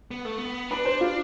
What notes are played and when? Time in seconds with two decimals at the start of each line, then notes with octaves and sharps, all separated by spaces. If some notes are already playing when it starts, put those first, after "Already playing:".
0.11 B3
0.25 A3
0.38 B3
0.71 D4 B4
0.85 C5
1.01 F4